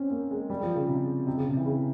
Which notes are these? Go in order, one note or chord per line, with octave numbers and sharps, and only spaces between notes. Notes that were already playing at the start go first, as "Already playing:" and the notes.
Already playing: C4 C#4
A#3
G#3
G3
F3
C#3
C3
C3
C#3
C3
E3
C#3